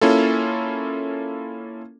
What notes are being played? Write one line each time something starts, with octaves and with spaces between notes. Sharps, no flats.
A#3 C#4 E4 F4 A4